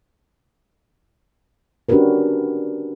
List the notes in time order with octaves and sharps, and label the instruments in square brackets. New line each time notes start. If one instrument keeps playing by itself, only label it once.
[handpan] C#4 D4 F#4 G4 A#4 B4